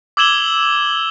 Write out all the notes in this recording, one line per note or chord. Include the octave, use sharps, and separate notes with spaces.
D6 E6 G#6 E7 F#7 G7